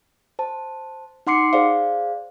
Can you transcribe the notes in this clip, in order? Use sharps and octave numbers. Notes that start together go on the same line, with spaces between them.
C5 A5
D#4 F#5 C6 D6 C7 C#7
G#4 C5 D5 F5